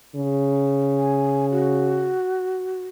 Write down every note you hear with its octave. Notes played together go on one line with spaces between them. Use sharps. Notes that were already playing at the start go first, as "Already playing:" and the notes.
C#3
G#5
F#4